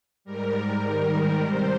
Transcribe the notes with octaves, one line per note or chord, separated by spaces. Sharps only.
G#2 G3 A#4
G#2 D#3 G3
C3 G3 C5